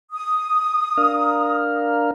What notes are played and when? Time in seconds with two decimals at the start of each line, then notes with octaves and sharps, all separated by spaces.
0.13 D#6
0.97 D4 A#4 F5